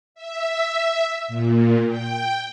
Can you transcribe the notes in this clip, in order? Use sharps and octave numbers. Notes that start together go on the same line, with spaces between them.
E5
A#2
G5